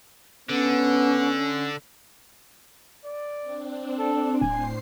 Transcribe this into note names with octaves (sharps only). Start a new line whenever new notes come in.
D3 B3 C#4
D5
C4 D4
A4
D1 A2 C5 G#5 C7